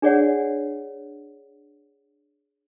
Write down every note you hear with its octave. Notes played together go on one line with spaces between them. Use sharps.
D4 G#4 C#5 D5 F#5